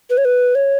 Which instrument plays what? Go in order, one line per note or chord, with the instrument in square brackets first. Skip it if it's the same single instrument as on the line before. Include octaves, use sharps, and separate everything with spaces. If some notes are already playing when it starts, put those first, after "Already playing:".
[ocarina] B4
C#5
B4
C#5